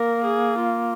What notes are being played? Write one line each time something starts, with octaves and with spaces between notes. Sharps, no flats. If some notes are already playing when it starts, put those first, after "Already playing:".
Already playing: A#3 A#4
G#4
F4